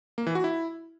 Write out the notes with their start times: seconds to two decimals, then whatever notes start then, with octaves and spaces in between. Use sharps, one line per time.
0.18 A#3
0.26 E3
0.35 F#4
0.44 E4